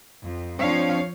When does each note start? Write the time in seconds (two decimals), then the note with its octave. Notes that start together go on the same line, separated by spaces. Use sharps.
0.23 F2
0.59 F3 C4 D4 C#5 F5